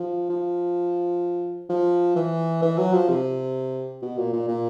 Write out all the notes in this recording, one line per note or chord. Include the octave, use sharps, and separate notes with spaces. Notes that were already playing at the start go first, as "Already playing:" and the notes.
Already playing: F3
F3
F3
E3
E3
F#3
F3
C3
B2
A#2
A#2
A#2